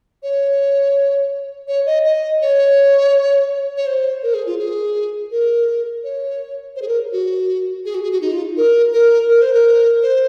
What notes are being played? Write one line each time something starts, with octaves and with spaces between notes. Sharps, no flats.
C#5
C#5
D#5
D#5
C#5
C#5
C5
A#4
G#4
F4
G#4
A#4
C#5
C5
G#4
A#4
F#4
G#4
F#4
G#4
F#4
D#4
F4
A#4
A#4
A#4
C5
A#4
C5